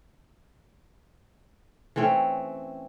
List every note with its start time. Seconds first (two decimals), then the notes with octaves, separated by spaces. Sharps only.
1.96 E3 A3 C4 C#4